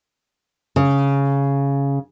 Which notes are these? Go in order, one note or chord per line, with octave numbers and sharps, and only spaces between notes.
C#3